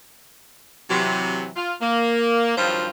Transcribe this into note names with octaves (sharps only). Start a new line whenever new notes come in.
C3 E3 F#3
F4
A#3
G2 D#3 F3 F#3 F4 C5